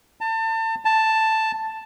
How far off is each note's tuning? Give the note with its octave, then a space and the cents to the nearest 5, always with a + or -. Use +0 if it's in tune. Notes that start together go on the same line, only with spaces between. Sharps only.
A5 +30
A5 +5